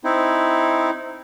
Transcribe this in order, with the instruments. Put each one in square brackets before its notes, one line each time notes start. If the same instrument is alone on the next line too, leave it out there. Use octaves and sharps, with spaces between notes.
[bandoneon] C4 D#4 E4